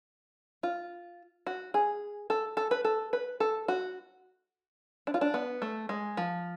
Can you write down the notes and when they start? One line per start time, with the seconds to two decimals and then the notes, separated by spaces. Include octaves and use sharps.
0.63 F4
1.47 F#4
1.74 G#4
2.30 A4
2.57 A4
2.71 B4
2.85 A4
3.13 B4
3.40 A4
3.68 F#4
5.07 D4
5.14 F4
5.21 D4
5.34 B3
5.62 A3
5.89 G#3
6.17 F3